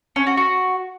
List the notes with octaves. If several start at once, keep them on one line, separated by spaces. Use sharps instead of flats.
C#4
F#4
F#4